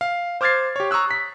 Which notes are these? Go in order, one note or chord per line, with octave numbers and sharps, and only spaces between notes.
F5
C5 D6 F6 G#6 A6 C7
G4 C#5
A#5 C#6 D#6 E6 F#6
B6